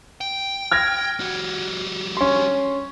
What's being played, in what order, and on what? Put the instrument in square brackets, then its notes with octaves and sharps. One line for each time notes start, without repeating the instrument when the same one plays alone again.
[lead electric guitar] G5
[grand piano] F6 G#6 A#6
[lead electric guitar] G3 F#4
[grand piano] C#4 C6